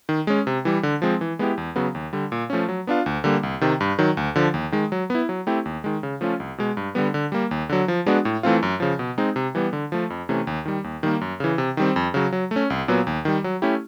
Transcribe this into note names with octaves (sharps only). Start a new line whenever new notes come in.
D#3
G#3 C#4
C3
E3 G3
D3
F3 G#3 C4
E3
G#3 B3 E4 G4
E2
C#3 F#3 B3
D#2
D3 G3
A#2
F3 A3 C#4
F#3
B3 D4 F4
D2
D3 G3 A#3
C2
C3 D#3
G2
D#3 F#3
D2
D3 F3
D#2
D#3 G#3
F#3
B3 E4
F#3
A3 C4 E4 G4
D#2
D#3 G#3
C#3
F3 A3 C#4 F4
C2
B2 G#3
G2
D3 G3 B3
D3
G3 A#3
D#2
D3 F#3
F3
G#3 B3 D4 F#4
A2
E3 A3 C4 F4
F#2
C#3 F3
B2
G#3 C4 D#4
C3
E3 G3 B3
D3
F3 A3
F2
C3 E3 A3 C#4
D#2
D#3 G3
D#2
D#3 G3 A#3
F#2
C#3 E3
C3
D#3 G3 C4
F2
C#3 F#3
F#3
A3 C#4
C2
A#2 F#3 B3
D#2
D#3 G3
F#3
A3 C#4 E4 G4